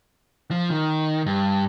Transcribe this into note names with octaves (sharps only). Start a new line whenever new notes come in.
F3
D#3
G2